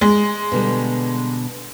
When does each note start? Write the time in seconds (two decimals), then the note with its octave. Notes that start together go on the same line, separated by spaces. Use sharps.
0.01 G#3
0.52 B2 D3 G3